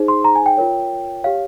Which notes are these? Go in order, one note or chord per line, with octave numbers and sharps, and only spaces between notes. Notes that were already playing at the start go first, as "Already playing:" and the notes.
Already playing: D#4 G#4 C5
C6
A#5
G#5
G5
F4 A#4 C#5
G4 C#5 F5